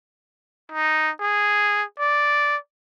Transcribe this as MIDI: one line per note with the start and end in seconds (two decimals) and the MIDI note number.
0.72 1.10 63
1.21 1.83 68
2.00 2.56 74